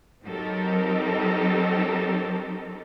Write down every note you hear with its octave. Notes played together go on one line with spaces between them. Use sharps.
F#3 C4 D#4 G4 A4 A#4